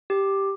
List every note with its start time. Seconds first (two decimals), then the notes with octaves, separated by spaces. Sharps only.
0.10 G4